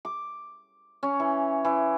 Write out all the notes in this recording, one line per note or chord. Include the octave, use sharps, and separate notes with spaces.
D6
C#4
E3
E3